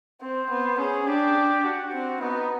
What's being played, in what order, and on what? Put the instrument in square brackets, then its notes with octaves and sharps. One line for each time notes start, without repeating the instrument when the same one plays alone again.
[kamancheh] C4 [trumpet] C5
[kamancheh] B3
[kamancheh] C#4 [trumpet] G#4
[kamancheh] D4 [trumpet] G4
[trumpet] F#4
[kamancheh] C4
[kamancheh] B3 [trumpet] D#4